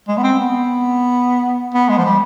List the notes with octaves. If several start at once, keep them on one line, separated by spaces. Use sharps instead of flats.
G#3
B3
C4
B3
B3
G#3
F3
G3